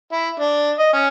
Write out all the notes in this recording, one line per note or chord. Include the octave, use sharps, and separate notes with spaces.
E4
D4
D#5
C#4